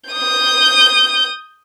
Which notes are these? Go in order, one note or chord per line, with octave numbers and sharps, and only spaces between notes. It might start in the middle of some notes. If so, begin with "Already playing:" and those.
D#6 G6